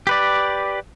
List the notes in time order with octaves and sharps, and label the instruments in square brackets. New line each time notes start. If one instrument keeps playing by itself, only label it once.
[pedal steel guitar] G4 B4 D5